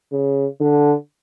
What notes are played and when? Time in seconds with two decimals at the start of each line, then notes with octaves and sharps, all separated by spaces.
0.12 C#3
0.60 D3